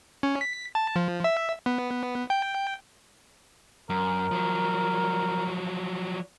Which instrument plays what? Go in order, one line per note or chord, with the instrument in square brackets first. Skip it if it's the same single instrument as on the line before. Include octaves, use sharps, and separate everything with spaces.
[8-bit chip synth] C#4
B6
A5
F3
E5
B3
G5
[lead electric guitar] F#2 [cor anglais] A#4
[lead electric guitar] F3 F#3